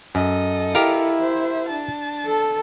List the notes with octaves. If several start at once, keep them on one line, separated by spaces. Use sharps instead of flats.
F#2 A4 D#5
E4 G4 A#4 F5
C5 E5
D4 A5
A4